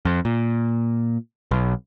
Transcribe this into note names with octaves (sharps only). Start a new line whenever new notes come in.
F2
A#2
B1